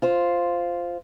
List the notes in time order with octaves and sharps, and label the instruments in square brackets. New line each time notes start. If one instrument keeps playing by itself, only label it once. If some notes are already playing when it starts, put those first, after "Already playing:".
[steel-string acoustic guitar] F4 C5